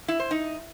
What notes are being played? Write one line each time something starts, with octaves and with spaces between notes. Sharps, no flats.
E4
C5
D#4